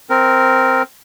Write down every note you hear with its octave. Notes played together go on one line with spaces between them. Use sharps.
C4 A#4